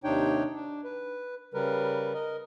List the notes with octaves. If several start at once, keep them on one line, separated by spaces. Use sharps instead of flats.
D#2 C3 D4 D#4 C#5 G5
D4
B4
C#3 G3 A#4 B4
A#4 D#5